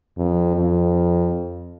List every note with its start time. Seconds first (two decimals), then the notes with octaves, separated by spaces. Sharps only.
0.18 F2
0.56 F2